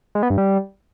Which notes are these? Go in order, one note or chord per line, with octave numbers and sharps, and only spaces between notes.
G#3
B3
G2
G3